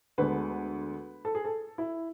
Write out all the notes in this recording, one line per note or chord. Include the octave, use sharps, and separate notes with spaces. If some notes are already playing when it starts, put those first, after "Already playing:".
D2 D3 G#3 B3 B4
A4
G#4
A4
E4